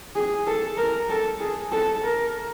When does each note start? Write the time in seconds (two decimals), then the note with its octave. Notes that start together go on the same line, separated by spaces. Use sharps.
0.15 G#4
0.47 A4
0.77 A#4
1.10 A4
1.40 G#4
1.72 A4
2.03 A#4